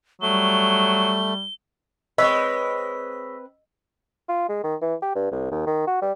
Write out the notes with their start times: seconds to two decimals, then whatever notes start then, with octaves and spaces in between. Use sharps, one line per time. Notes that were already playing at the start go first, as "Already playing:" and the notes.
0.22 F#3 G3 A3 G7
2.18 G#3 C4 B4 C#5 D#5 E6 B6
4.29 F4
4.49 G#3
4.64 D#3
4.81 E3
5.02 G4
5.15 G2
5.32 C2
5.51 D#2
5.66 D#3
5.87 F#4
6.02 G3